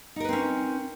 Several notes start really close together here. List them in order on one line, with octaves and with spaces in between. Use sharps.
D#4 A#4 B4 C4 C#4